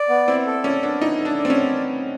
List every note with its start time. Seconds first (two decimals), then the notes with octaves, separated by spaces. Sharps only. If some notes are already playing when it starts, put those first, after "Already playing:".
Already playing: D5
0.09 B3
0.27 C4 E4
0.47 A4
0.64 C#4 D5
0.83 B3 D4
1.01 D#4 E4
1.19 A4
1.25 D4
1.38 D5
1.45 C4
1.50 C#4
1.55 B3